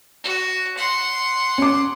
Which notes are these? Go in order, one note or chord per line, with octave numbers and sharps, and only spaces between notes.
F#4
F#5 C6
C#4 D6